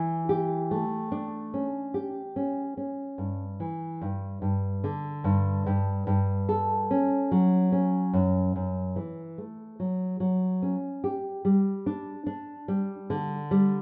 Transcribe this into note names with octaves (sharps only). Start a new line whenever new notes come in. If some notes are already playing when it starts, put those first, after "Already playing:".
Already playing: E3
G4
A3
D4
C#4
G4
C#4
C#4
G2
E3
G2
G2
D3
G2
G2
G2
A4
C#4
F#3
C#4
F#2
F#2
E3
A3
F#3
F#3
C#4
G4
G3
D4
D4
G3
D3
G3